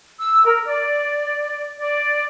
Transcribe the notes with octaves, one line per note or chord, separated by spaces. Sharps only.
E6
A#4
D5
D5